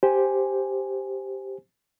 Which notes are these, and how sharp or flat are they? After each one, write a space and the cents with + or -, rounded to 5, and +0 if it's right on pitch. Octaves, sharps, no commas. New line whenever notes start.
G4 +0 C5 +0 G#5 +0